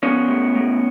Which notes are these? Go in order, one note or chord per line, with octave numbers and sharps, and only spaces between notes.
F3 B3 C#4
A2
A2